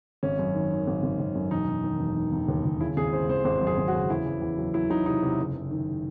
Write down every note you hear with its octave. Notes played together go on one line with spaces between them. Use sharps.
G#1 C#4
F#2
D#3
D#3
G#1
G#1
G#1
F#2
E1 D#4
E1
D#3
E1
D#3
E1
D#2
D#2
C#3 E4
G#1 G#4
C#3 C5
G#1 C5
G#1 C5
F#2
G#4
G#1
F#4
C#3
E2 E4
E2
E2
F#3
F#3 E4
F#3 D#4
C3 D#4
C3
F#1
F#1
D#3